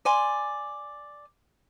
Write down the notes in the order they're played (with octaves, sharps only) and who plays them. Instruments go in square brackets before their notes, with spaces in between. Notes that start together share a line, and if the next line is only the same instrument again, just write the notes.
[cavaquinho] D5 G#5 C6